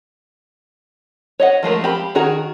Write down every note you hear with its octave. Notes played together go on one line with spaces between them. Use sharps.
C#5 D#5 F#5
F3 G#3 A3 A#4
F3 C4 G4 B5
D#3 F#4 G#4 A#5